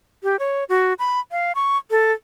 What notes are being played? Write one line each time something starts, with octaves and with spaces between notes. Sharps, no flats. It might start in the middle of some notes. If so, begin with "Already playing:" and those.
G4
C#5
F#4
B5
F5
C#6
A4